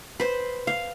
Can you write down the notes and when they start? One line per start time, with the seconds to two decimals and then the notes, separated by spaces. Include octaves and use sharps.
0.20 B4 C5
0.67 F5